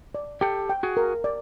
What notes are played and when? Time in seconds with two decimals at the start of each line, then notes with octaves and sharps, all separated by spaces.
0.15 D5
0.41 G4 A4 G5
0.69 G5
0.83 F#4 G#4
0.97 A#4
1.24 D5